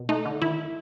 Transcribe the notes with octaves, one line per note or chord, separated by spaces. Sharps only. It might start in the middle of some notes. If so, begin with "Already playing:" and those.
Already playing: B2
A3 D#4
D3
D#3 E4